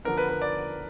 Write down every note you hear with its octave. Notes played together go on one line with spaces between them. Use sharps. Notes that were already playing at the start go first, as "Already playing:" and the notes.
D3 F3 B3 D4 A#4
B4
B4
D5